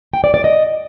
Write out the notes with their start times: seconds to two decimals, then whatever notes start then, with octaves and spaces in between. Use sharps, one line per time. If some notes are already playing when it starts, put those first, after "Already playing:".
0.13 G5
0.24 D5
0.34 D5
0.44 D#5